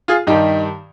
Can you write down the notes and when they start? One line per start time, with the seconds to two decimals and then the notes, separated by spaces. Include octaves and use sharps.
0.08 F4 G#4
0.27 G2 D#3 G3 D#4 G4